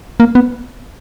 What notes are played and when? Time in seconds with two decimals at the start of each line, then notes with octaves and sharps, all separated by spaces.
0.20 A#3
0.35 B3